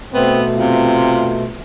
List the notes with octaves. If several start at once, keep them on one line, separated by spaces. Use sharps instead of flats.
B2 A3 B3 C4
C3 F4